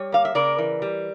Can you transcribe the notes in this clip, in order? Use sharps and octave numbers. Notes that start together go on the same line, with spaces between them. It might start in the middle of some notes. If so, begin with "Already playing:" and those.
Already playing: G3 C#5
A#3 F5
E5
C#3 A#4 D5
E3
G3